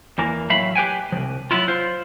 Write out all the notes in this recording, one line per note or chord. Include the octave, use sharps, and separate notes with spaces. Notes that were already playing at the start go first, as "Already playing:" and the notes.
E2 E3 A#3
A2 F#3 E5 F5 B5
G4 B4 G5 G#5
C2 F3
F#3 B3 E4 F4
F4 C5